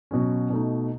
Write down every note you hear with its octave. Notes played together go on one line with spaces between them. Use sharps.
B2 F#3 C#4
B2 A3 D#4